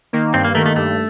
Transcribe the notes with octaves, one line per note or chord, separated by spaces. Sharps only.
D#3 A#3
G2 C4
A#3
D#3 A3 A#3
A3
G2 A3